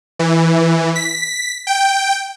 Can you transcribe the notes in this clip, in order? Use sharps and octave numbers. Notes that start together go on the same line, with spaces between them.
E3
B6
G5